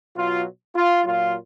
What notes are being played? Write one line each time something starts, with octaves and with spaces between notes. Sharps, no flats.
B2 F#3 F4
F4
A#2 F#3 F4